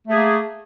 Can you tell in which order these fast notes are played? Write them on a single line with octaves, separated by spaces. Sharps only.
A3 G#4 A#3